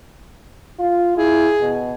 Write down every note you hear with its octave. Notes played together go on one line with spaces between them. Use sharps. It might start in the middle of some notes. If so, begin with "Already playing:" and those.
F4
E4 G#4
B2